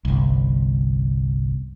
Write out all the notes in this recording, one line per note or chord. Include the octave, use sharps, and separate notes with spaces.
G1 C2